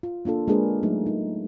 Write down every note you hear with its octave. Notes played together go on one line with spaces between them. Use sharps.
F4
A#3 D4 F4 A4
G#3 A#3 D4 G#4 A#4 B4
F#3 A3 A#3 D#4
D#4